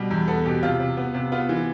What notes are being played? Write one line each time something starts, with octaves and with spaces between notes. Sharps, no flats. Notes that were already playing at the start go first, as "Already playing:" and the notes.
Already playing: B2 G3
E2
B3 A4
B2 G4
C3 F4
C3
B3
C3
B3 F4
E3